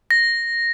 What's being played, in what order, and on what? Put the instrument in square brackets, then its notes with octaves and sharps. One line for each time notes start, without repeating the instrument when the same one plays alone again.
[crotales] A#6